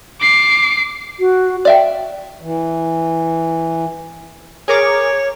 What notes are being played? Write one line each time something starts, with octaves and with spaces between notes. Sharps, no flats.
D6 C7
F#4
D5 E5 G5
E3
G#4 A#4 C#5 D6